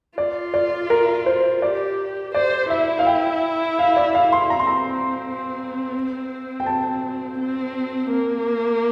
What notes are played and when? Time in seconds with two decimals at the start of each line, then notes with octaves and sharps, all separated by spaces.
0.18 F4 D5
0.54 D5
0.90 A#4
1.26 C5
1.62 G4 D5
2.34 C5 D5
2.70 E4 E5
2.99 F5
3.07 G5
3.79 F5
3.97 D5
4.15 F5
4.32 C6
4.50 C4 A#5
4.59 C6
4.67 A#5
6.60 G5
6.66 A5
7.39 C4
8.11 A#3